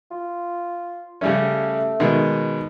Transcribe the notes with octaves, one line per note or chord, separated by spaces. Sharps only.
F4
C#3 G3 A3 C#4
B2 D#3 G#3